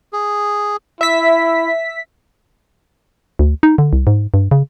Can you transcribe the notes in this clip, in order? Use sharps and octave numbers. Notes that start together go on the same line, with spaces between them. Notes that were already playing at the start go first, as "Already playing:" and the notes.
G#4
E4 E5 B6
D2
D#4
D3
C2
G#2
G2
C#3